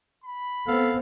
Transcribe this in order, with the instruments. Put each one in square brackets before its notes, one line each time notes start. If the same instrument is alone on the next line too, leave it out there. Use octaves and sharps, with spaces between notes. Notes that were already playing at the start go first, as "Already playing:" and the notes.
[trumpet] B5
[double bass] B3 C4 [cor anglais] A4 [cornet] F5